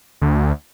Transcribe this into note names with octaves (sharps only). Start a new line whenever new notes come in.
D2